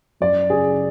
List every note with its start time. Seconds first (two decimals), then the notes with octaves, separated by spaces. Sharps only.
0.21 F#2 D5
0.50 C#3 G#4